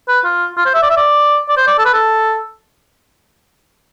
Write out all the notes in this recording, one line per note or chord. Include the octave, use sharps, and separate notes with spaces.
B4
F4
F4
C5
E5
D5
E5
D5
D5
C5
D5
A4
B4
A4